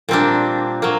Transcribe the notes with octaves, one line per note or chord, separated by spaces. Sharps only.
A#2 G3 A#3 C4 D4
F#3 A#3